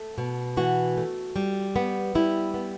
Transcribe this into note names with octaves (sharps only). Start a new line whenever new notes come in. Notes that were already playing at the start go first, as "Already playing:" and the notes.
Already playing: A3
B2
E3 F#4
A3
G3
B3
G3 E4
B3